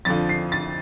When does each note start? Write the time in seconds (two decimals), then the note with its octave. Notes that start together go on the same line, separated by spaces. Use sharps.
0.05 F2 D3 F3 A6
0.29 C7
0.52 A6